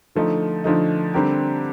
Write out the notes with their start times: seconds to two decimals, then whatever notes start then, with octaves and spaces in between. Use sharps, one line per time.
0.15 D3 F3 A3 D#4
0.64 D3 F3 A3 D#4
1.14 D3 G3 C4 G4 A#4